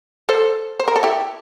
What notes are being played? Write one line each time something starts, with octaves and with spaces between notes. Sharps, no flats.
A4 C5
C5
A#4
A4
E4 G4